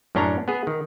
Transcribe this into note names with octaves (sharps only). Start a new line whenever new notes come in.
F#2 A2 C#4 D4 C#5 A#5
B3 G#4
D#3